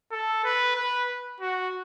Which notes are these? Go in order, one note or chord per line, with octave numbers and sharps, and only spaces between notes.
A4
B4
B4
F#4